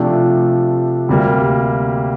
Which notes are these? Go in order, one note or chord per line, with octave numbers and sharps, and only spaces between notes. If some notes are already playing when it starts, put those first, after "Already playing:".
Already playing: C3 F3 A3 D4
D2 C3 G3 A#3